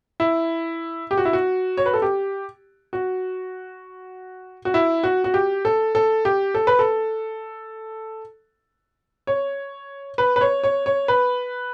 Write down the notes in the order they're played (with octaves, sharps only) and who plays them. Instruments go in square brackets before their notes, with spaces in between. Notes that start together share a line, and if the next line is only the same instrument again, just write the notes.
[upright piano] E4
G4
F#4
E4
F#4
C#5
B4
A4
G4
F#4
F#4
E4
F#4
F#4
G4
A4
A4
G4
A4
B4
A4
C#5
B4
B4
C#5
C#5
C#5
B4